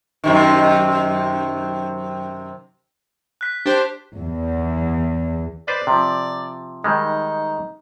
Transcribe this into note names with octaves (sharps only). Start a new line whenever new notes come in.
F#2 C3 D#3
F#6 B6
D4 G4 C5
E2
B4 C5 D5
C3 F3
D#3 G3 G#3 D#4